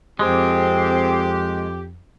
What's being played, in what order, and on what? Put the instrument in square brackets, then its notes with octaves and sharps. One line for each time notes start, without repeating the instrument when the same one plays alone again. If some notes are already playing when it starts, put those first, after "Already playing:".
[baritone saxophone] F2 [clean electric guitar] G#3 [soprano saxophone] C4 [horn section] G4